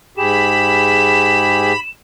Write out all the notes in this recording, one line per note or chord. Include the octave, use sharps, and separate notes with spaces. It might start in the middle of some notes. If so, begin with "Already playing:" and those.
G#2 G4 G#4 B5 E7